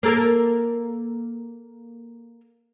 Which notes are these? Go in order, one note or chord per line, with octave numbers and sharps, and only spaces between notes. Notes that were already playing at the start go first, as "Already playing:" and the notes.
A#3 A4 A#4